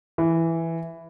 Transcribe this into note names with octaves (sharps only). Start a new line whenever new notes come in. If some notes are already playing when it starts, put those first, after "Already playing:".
E3